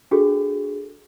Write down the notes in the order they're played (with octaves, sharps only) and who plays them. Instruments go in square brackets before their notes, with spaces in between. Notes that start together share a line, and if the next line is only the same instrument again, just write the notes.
[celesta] D4 F#4 G#4 A4